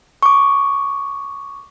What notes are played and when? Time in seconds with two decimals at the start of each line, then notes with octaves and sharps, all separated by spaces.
0.23 C#6 D6